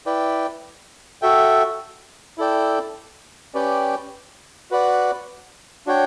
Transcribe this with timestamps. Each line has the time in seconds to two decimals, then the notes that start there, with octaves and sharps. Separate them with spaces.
0.06 E4 B4 D5 G5
1.22 F#4 A4 E5 G5
2.38 E4 A4 D5 G5
3.54 C#4 G4 B4 D5 G5
4.71 F#4 B4 D5 F#5
5.86 D4 F#4 C#5 G5